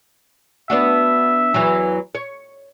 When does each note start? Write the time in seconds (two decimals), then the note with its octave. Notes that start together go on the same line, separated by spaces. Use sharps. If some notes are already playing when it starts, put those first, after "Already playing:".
0.70 B3 D4 F#4 E5
1.54 E2 E3 F#3
2.15 C#5